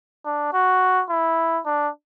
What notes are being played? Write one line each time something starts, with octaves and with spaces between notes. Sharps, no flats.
D4
F#4
E4
D4